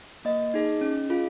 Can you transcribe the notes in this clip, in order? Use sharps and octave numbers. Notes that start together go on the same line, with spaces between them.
A#3 D#5
D#4 G#4
C#4
F4 G#4